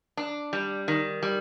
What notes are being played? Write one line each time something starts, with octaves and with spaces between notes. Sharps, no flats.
D4
G3
D#3
G3